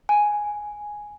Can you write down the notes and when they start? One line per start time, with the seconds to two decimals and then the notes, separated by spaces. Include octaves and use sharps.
0.09 G#5